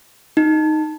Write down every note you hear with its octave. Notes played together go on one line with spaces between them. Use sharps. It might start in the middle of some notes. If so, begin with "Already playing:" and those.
D#4